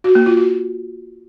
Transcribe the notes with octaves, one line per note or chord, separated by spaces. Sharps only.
F#4
A#3
F4
F#4